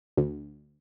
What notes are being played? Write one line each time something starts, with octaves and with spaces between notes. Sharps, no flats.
D2